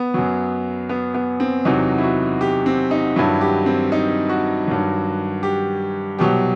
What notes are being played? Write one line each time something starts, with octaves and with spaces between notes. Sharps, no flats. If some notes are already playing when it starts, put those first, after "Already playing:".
Already playing: B3
F#2 F#3
B3
B3
C4
E2 C3 F#3 D#4
E4
F#4
G4
C4
D#4
G2 D#3 F#3 E4
G4
C4
D#4
F#4
G2 D#3 F#3
G4
C2 B2 F#3 G4